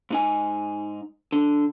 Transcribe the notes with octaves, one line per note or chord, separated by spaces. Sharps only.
G#2 D#4 G#5
D3